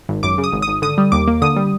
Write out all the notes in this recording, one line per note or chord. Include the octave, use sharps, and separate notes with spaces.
G#1
F#2 D6
C#3
D#6
G#1
D#6
G#1
D3 D#6
G3
D#2 D6
A#3
D3 D#6
G3